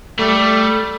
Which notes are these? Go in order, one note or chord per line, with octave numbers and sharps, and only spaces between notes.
G3 A3